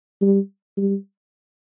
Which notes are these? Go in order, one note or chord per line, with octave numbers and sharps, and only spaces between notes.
G3
G3